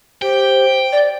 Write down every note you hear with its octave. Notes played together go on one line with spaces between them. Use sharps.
G4 C5 G5
D5